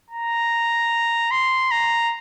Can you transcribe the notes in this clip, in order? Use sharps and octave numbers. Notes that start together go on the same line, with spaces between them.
A#5
C6
A#5